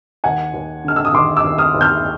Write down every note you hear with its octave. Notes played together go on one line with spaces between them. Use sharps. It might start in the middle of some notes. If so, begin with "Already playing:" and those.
D#2 F#5 G#5
D#2
D3 F6
E6
D#6
D#2 C6 D6
D6 E6
D#2
D#6 F6
D#2
F6 G6